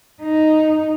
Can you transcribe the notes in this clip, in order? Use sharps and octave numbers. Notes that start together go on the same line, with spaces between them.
D#4